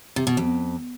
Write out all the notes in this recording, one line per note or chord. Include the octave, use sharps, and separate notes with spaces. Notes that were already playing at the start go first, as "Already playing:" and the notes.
C3
B2
F2